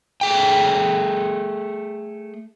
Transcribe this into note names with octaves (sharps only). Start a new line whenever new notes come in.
A3 G#4 G5